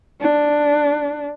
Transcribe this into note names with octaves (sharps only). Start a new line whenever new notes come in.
D4